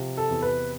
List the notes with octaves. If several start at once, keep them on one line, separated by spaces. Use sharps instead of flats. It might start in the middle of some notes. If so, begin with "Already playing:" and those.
Already playing: C3 F3
A4
E2
B4